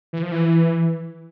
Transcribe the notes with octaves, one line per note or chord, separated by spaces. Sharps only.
E3
F3
E3